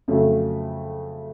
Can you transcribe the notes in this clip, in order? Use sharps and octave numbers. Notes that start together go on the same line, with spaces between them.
F2 C#3 F#3 A3 C#4